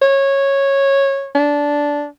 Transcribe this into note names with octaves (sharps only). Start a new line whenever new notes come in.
C#5
D4